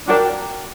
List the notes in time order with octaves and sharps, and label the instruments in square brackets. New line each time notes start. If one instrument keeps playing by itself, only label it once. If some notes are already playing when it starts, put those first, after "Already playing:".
[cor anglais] D4 [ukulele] F#4 A#4 D5 G5